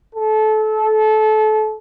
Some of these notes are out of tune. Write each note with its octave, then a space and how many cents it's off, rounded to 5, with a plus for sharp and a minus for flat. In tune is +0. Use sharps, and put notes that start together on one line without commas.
A4 -25